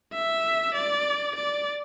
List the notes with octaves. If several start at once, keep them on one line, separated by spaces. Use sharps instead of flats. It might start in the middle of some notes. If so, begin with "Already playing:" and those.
E5
D5
D5